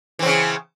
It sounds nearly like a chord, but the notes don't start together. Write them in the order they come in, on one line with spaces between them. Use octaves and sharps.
E3 C4 C#3